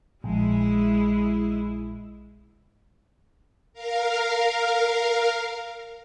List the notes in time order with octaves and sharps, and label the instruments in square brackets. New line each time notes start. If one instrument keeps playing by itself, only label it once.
[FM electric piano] A#1 [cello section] G#3 E4
[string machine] A#4 F5